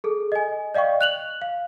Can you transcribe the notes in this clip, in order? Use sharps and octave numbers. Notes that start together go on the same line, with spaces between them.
G#4 A4
D#5 G#5
D5 D#5 F5 G5 C#6
F#6 F7 F#7
F5